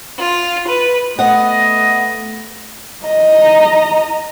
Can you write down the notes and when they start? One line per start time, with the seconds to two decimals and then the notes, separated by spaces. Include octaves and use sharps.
0.20 F4
0.68 B4
1.19 A3 B3 D#5 F#5
3.05 D#5 A#5